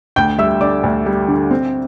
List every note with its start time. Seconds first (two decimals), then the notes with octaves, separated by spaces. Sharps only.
0.16 D2 G5 G6
0.38 G3 E5 E6
0.60 D3 D5 D6
0.83 D2
1.06 G3
1.28 D3
1.51 C4